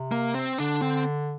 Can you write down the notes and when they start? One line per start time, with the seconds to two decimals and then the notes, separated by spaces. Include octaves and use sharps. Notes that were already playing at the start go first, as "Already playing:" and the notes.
Already playing: C3
0.12 A#3
0.34 C4
0.58 D3 D4
0.81 C4